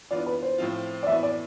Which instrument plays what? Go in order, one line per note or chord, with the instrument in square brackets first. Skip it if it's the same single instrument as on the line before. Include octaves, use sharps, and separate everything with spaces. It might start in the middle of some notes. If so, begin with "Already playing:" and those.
[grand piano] E3 B3 D4 F4 [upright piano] D5
[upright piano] B4
C5
[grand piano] A2 F3 C4 F4
[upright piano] D5
[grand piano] A2 E3 B3 E4 [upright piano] E5
[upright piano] D5